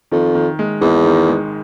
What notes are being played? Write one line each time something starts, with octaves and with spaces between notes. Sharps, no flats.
F2 D#3
D#3
G#3
G#1 E2
D#3
G#3